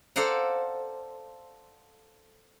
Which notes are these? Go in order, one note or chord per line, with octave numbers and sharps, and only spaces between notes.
A4 C5 D5 F5 F#5 A#5